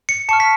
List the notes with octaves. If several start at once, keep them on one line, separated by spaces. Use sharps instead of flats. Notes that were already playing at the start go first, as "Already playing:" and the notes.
C#7
A5 C#6 F6 C#7
B6